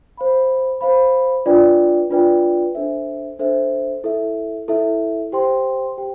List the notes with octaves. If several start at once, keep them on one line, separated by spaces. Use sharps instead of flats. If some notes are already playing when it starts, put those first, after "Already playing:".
C5 F5 B5
C5 F5 B5
D4 F4 B4 D5 G5
D4 F4 B4 D5 G5
D4 A4 C5 E5
D4 A4 C5 E5
E4 A4 E5
E4 A4 E5
G4 C5 G5 C6
G4 C5 G5